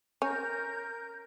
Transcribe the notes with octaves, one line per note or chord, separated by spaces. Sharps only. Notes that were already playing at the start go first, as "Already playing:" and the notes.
C#4 A#4 G6